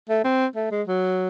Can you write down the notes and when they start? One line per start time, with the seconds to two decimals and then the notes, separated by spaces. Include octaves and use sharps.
0.09 A3
0.24 C4
0.55 A3
0.71 G#3
0.87 F#3